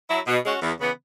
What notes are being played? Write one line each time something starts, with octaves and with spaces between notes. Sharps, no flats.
F#3 E4
B2
G#3 C#4 F#4
E2
C#3 E3 B3